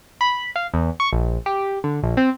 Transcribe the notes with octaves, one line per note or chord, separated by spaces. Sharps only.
B5
F5
E2
C#6
A#1
G4
D3
A#1
C4